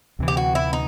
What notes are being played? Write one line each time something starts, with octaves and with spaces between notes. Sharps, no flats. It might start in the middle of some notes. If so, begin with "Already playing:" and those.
D2 C3 E3
G4
F#4
E4
D#4